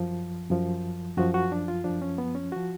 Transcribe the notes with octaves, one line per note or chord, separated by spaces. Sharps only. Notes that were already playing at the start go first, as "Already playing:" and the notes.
Already playing: F#2 F3
F#2 F3
F#2 F3 F#4
F#4
D4
F4
F#2 F3 D4
C#4
B3
C#4
F3 F#4